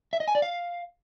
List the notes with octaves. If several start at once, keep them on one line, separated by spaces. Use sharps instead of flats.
E5
D#5
G#5
D5
F5